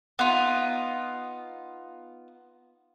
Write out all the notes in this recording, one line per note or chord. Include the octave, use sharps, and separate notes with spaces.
B3 D#4 F4